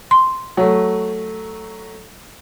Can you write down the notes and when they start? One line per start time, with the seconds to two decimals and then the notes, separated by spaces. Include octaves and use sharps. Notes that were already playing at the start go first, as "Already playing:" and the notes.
0.11 C6
0.57 F#3 A3